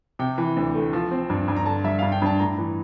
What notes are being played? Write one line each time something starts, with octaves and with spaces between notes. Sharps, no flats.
C3 G5
E3
D2
A3
F3
C4
G2
G2
A#5
D3 A5
G3 E5
G2 F5
G5
G2 A5
A2 A#5
E3